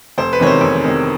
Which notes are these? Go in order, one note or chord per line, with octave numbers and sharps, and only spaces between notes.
F1 C5
B4
E2 C3 D#3 G#3 C#5
C5
F1
E2 C3 D#3 G#3